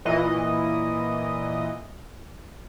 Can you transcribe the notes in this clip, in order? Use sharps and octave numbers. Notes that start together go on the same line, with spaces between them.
A#2 E3 D#5